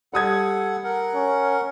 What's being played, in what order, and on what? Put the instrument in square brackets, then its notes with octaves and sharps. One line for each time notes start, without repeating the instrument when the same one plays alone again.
[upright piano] G3 D#6 G#6 [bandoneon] A4 F#5
[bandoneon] A#4 F#5
[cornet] C#4